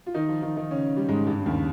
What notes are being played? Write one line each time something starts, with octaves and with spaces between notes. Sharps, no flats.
F4
D#3 D#4
F3 F4
D#3 D#4
D#3 D#4
C#3 C#4
G3
G#2 G#3
G2 G3
C#3
D#2 D#3